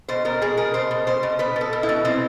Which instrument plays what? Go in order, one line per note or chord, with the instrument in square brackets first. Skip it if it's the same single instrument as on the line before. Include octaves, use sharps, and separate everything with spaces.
[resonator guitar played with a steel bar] B2 C5
B2 A#4
B2 G#4
B2 A#4
B2 C5
B2
B2 C5
B2
B2 B4
B2
A4
B2
E4
B2
B2 C4